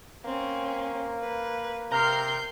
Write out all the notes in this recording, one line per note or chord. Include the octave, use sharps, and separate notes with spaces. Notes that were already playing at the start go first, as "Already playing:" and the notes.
A#3 C4 C#4
B4
C3 A#4 A#5 F6 G6 C7